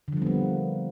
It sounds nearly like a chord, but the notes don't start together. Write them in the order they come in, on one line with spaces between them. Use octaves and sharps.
D3 F3 G3 B3 A#3